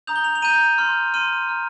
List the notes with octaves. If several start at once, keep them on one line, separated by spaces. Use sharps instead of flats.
A#5 D#6 G6 F7
G7
F7
F7
A#5 G6 D#7
C6 F6
C6 F6 D#7
A#5 F6